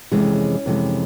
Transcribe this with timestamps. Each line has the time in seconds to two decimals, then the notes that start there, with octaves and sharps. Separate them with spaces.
0.12 F2 C3 E3 G#3 C#4
0.66 F2 C3 E3 G#3